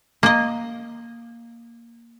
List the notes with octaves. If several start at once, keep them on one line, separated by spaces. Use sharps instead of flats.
A#3 D#5